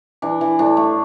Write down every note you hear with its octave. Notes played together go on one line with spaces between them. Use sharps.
E3 D4
E3
A2 D4
A3